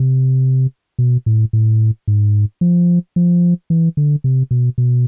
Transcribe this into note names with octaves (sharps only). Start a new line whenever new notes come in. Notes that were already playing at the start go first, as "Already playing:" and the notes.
Already playing: C3
B2
A2
A2
G#2
F3
F3
E3
D3
C3
B2
B2